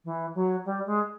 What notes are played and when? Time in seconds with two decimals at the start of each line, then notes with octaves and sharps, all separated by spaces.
0.05 E3
0.35 F#3
0.65 G3
0.86 G#3